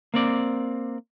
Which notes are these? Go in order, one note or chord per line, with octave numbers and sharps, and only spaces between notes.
A#3 C4 D5